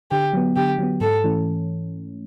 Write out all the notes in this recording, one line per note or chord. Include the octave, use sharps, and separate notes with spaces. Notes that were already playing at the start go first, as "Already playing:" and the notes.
D3 G4
F#3 B3
D3 G4
F#3 B3
G#2 A4
E3 A3 C#4